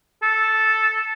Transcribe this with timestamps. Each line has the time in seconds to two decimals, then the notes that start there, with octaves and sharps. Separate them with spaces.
0.23 A4